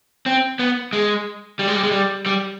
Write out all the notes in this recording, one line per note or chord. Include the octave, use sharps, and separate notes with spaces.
C4
B3
G#3
G3
G#3
G3
G#3
G3
G3